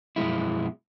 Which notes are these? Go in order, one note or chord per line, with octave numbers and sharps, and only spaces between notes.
F#2 B2 F3 G#3 E4